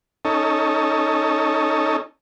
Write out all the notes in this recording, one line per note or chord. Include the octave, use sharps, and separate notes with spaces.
C#4 D#4 A4